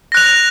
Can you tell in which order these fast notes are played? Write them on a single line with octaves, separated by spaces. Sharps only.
A#6 F#6 F7